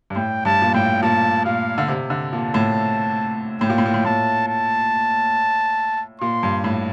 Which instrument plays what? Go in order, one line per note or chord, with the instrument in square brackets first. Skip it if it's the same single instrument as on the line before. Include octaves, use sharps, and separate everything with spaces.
[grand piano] G2
[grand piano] A2 [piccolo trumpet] G5
[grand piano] G2 [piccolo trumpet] A5
[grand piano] A#2
[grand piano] A2 [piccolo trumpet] G5
[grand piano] A#2 [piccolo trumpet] A5
[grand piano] A#2 [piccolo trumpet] F5
[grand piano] D3
C3
D3
[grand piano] A#2 [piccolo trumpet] A5
[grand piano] A2
[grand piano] A2 [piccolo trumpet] G5
[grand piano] A#2
A2
A#2
A2
[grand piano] A2 [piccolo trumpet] A5
[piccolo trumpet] A5
[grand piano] A#2 [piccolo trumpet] C6
[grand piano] G2
A2